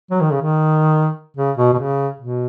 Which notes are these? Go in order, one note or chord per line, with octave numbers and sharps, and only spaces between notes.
F#3
D#3
C#3
D#3
C#3
B2
B2
C#3
B2